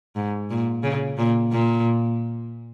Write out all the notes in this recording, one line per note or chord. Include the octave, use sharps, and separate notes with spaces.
G#2
A#2
C#3
A#2
A#2